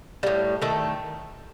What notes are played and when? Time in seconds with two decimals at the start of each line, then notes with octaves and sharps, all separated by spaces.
0.23 A2 G3
0.61 D#3 A3 A4